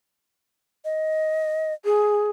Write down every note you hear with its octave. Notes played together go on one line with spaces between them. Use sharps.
D#5
G#4